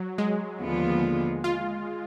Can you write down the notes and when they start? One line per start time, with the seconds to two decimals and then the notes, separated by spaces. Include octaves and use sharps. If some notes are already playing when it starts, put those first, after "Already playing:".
Already playing: F#3
0.18 G#3
0.60 D#2 D3 F3 B3 F4
1.44 F4